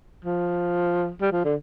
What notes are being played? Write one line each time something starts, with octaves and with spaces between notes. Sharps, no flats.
F3
G3
F3
D3